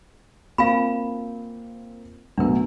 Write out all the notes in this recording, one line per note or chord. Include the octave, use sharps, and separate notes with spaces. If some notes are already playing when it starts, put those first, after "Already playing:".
A#3 C4 F4 F5 G#5 B5
A1 B2 F#3 D4 A#4